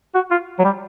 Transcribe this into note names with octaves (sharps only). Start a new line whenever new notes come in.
F#4
F4
F#3
G3